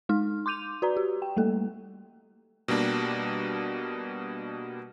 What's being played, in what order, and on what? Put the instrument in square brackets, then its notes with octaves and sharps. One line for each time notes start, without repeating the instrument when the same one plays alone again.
[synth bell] G#3 D#4 F6
C6 D6 G6 D#7 F7
F#4 B4 D5 A#5
G4
G5
G3 A3 A#3 A4
[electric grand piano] B2 G3 A#3 D4